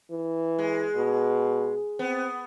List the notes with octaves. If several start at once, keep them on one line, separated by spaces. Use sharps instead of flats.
E3
G#3
B2
B3 C4